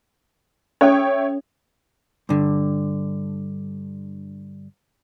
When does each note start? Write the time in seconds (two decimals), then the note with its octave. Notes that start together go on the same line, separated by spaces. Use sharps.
0.81 C#4 A4 C#5 E5 G5
2.29 G2 D3